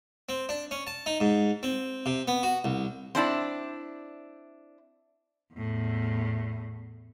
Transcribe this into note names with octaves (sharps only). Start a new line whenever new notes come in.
C4
D4
C#4
A5
D#4
G#2
C4
C3
B3
F#4
C2
C4 D4 E4 D5
E2 A2